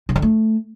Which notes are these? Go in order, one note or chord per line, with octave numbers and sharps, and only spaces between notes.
C#3
D3
A3